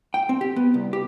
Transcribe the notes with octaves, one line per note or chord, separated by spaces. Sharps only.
G5
C4
G4
B3
C2
G4